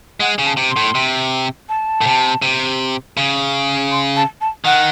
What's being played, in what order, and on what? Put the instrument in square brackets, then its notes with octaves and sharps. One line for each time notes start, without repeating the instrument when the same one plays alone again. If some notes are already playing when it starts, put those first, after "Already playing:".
[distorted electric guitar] G#3 [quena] F#5
[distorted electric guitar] C#3
[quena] A5
[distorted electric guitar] C3
[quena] C6
[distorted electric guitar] A2
C3
[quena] A5
[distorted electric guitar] A2
C3
C3
C#3
[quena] C6
A5
A5
[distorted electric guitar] D#3 [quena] F#5